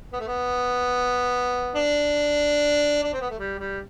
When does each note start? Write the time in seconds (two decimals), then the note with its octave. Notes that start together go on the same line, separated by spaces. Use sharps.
0.13 B3
0.20 A3
0.27 B3
1.75 D4
3.04 D4
3.13 C4
3.21 B3
3.30 A3
3.39 G3
3.59 G3